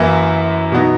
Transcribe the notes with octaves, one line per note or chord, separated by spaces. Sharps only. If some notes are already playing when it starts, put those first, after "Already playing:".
Already playing: F#2 E3 A#3 E4
B2 F#3 B3 D#4